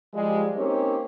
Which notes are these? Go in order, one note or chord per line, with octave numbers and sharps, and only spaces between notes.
F3 G3 G#3
A#3 C4 C#4 D#4 G4 C#5